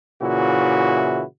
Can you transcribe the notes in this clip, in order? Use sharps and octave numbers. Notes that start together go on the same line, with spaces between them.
A#2 C#3 E3 E4 F#4